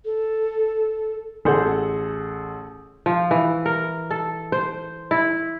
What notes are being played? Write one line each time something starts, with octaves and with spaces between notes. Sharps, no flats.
A4
A1 G#4 A4 F#5 C6 G6
F3
E3
A#4
A4
C5
E4